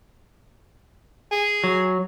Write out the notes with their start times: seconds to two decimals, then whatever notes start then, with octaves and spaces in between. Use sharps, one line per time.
1.31 G#4
1.64 F#3